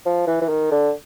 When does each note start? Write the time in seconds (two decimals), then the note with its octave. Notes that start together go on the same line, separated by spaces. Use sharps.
0.06 F3
0.27 E3
0.41 E3
0.49 D#3
0.71 D3